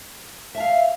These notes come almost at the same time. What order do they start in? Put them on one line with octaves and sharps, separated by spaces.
E5 A5 F5